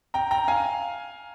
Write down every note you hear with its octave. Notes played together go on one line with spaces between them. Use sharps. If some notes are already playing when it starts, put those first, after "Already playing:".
G5 A#5
G5 A#5
F5 G#5